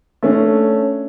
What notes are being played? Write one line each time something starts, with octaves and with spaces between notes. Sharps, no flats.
A3 C#4 D4